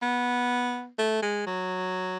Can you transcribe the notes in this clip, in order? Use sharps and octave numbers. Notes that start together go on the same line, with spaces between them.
B3
A3
G#3
F#3